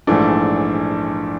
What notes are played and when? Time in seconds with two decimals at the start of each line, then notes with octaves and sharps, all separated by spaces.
0.07 A#1 G#2 E3 A3 D4